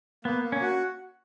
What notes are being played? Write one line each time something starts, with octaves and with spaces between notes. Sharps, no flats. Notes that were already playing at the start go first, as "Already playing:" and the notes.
A#3 B3
A#3
C#4
F#4